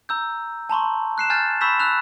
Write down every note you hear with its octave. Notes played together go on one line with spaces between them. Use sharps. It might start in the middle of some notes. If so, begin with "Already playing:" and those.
A#5 E6 G6
A5 A#5 C6 C#6
F#6 C7 E7
G#5 F6 G6 A6
B5 C#6 E6 G6 B6 E7
E6 F#6 F7